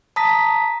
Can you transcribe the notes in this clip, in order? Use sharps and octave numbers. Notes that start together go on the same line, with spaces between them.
A5 A#5 D#6 A#6 B6